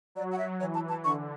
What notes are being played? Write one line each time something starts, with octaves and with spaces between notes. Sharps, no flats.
F#3 D5
F#5
E5
E3 C#5
A5
A5
D3 C#6